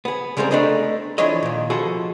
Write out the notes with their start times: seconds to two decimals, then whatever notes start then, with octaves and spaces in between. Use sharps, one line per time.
0.05 B3 G#4
0.37 C#3 G3 G#3 C4 A4 A#4
0.51 A3 B3 D4 D#4 G#4 D#5
1.18 E3 F3 D4 C#5 D#5
1.43 A#2 D#3
1.70 B2 F3 F#4 G#4 A4